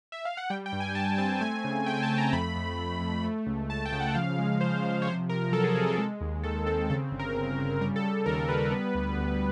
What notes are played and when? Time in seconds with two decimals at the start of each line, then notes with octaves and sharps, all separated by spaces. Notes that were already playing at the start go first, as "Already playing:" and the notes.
0.12 E5
0.25 F5
0.37 F#5
0.50 G3 G5
0.66 G5
0.72 G2
0.80 G#5
0.95 G2 A5
1.18 C4 A5
1.41 A3 G#5
1.64 C#3
1.86 A3 G5
1.97 G#5
2.03 A5
2.10 A3
2.18 A#5
2.32 F2 B5
2.56 F2
2.78 F2
3.01 F2
3.24 A3
3.47 C#2
3.69 C#2 A5
3.85 G5
3.92 C#3
4.00 F#5
4.15 F3 F5
4.38 G#3
4.61 F3 C5
4.84 F3
5.02 C#5
5.07 C3 C5
5.29 C3 A#4
5.52 F#3 A4
5.64 G#4
5.75 C3 G#4
5.87 A4
5.98 G#3
6.21 D#2
6.43 D#3 A4
6.66 C4 A4
6.90 C#3 A4
7.12 G1
7.19 A#4
7.35 G1
7.58 C#3
7.81 G3 A#4
7.96 A4
8.04 G3
8.11 A4
8.26 D#2 A#4
8.49 G3 B4
8.71 B3
8.95 D2
9.17 D2